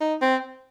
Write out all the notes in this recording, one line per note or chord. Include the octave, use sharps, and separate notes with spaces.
D#4
C4